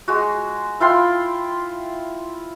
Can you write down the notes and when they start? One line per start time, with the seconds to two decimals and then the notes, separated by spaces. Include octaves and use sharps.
0.08 G#3 F#4
0.80 E4 F4 G5 C6